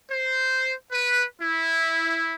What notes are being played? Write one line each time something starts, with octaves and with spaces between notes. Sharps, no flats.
C5
B4
E4